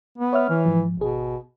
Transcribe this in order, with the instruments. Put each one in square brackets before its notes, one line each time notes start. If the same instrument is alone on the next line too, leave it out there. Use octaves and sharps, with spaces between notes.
[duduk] B3
[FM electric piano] C#5 E5 F6
[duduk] E3
[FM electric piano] G#2 F3
[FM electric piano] G#1 G#4 [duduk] B2